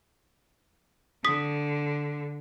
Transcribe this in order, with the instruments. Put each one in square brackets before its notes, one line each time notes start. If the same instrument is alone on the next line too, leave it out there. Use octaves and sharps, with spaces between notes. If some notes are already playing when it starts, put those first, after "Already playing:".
[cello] D3 [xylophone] D#6 B6